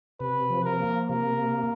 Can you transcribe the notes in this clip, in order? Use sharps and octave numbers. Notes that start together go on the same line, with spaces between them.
C3 B4
F3
A#4
A#3
C3 A#4
A#3